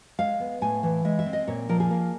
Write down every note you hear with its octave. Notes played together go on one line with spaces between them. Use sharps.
G#3 F5
B3
A2 G#5
E3
G#3 E5
E5
C4
D#5
A#2 C#5
F3 A#4
G#4
A#3